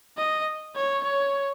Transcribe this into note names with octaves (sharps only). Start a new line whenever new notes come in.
D#5
C#5
C#5